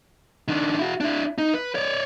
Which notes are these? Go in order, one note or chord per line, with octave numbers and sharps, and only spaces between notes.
D#3 D4
E4 F#4
D4 E4
D#4
B4
C#5 D5